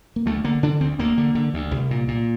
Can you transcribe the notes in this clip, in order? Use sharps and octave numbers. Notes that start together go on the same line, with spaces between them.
A#3
D2 A3
D3 A#3
D3 D4
D2 C4
D2 A#3
D3
D3
D2
C2
A#2
A#2